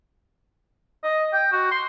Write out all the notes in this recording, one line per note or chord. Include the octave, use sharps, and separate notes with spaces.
D#5
G5
F#4
C6